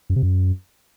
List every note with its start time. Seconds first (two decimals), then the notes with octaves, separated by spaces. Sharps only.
0.10 F#2
0.16 C3
0.23 F#2